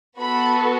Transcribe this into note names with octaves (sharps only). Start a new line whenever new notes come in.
B3 F#4 A4 B5